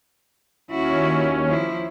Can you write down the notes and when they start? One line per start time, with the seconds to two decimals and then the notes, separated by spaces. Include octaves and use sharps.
0.71 D#2 C#4 E4 F#4
1.48 F3 E4